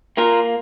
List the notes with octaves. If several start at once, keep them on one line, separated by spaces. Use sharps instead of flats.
A#3 F4 A#4